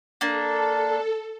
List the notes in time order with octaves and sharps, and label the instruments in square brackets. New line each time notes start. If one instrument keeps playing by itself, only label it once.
[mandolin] A#3 D4 [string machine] A4